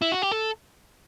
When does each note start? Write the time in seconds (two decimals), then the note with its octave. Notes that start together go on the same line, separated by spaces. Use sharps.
0.02 E4
0.12 F#4
0.22 G4
0.31 A4